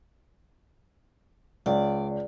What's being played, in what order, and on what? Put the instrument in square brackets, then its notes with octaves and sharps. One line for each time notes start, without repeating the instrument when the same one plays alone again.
[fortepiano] C#2 [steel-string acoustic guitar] D5